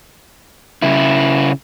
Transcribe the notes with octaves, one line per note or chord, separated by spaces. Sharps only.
C#3 E4